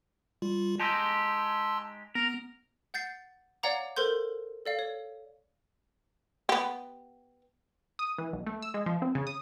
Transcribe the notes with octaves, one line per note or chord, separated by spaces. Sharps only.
G3 F4
G#3 D#4 G4 A5 C6 E6
B3 A#4
F#5 G6 A6 C7
C#5 D5 F5 F#5 A#5 D6
A4 A#4 C5 C6 G6
A4 D5 F5
C#5
B3 G4
D#6
E3
B1
A3
E6
G#3
F3
C4
C#3
D#6